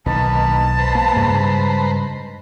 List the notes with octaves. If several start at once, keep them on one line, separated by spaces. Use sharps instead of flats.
B1 D#3 E3 A#3 B4 A5
B4 C5 A#5
A#3
G2 C#3 G#3